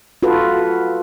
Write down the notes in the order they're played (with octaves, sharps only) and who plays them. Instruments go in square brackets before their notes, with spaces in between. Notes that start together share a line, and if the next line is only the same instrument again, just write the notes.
[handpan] F4 F#4 A4 B4